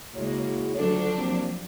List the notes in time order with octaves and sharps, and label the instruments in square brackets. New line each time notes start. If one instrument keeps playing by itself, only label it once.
[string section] C#2 G#3 A#3 [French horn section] E4 F#4 C#5
[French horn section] D2 A4 [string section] F3 F#3 D4
[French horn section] G3 A#3 C4